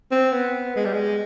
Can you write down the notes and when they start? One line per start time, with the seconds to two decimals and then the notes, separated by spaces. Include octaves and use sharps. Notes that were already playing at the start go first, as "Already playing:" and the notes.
0.11 C4
0.32 B3
0.76 G#3
0.85 G3
0.93 G#3